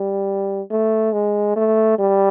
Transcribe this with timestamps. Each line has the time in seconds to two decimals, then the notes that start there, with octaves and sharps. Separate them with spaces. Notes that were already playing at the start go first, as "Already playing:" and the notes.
Already playing: G3
0.71 A3
1.13 G#3
1.56 A3
1.99 G3